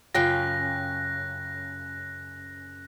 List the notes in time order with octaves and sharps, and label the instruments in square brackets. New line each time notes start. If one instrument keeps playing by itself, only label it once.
[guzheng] F#2 C#3 [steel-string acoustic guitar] F4 G5 [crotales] F#6 A#6